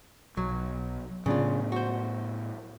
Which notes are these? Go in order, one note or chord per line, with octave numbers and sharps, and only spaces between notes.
B1 F#3
A2 C#3 F#3 B3 D4 F4
F#4 C5